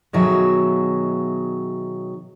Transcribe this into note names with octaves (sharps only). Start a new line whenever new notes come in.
B2 D#3 F#3 G#4 E5